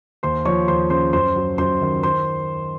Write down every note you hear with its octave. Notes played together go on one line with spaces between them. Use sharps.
D#2 C5 C6
F3 C#5 C#6
D#2 C5 C6
C#3 C5 C6
F#2 C5 C6
F#3
F#2 C5 C6
D#3
C5 C6